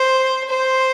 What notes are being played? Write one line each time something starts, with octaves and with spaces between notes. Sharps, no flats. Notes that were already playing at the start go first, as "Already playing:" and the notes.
Already playing: C5
C5